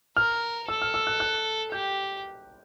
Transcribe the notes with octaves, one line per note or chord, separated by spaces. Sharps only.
A#4 F6
A4 E6
F6
E6
F#6
F#6
G4 G6